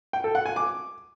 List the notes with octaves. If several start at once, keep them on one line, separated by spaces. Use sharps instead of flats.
G5
A4
F#5
G#5
D6